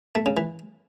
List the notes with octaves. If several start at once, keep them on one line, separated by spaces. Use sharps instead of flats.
A3
C#3
E3